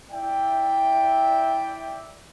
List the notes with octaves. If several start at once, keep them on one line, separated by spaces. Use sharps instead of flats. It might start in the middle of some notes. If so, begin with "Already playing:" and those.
E4 D5 E5 G5